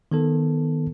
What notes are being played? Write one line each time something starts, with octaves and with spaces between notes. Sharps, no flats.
D#3 B3 A4